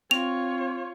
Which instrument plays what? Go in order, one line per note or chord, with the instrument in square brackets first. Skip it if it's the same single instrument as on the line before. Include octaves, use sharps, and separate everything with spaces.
[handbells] C4 [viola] F4 C#5 [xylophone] F7